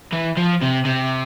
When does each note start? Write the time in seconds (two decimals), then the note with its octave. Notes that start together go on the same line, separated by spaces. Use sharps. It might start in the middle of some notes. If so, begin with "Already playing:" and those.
0.12 E3
0.37 F3
0.62 C3
0.85 C3